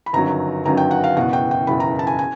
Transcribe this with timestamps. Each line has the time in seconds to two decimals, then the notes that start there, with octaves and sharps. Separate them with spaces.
0.06 B5
0.13 G1 F#2 D#3 F#3 A#5
0.65 G1 F#2 D#3 F#3 A#5
0.77 G5
0.91 F#5
1.04 F5
1.16 F#1 E2 B2 F#5
1.33 G5
1.51 G5
1.67 F#1 E2 B2 B5
1.80 A#5
1.99 A5
2.07 G#5
2.19 G#5